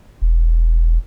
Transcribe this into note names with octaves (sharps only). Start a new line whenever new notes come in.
E1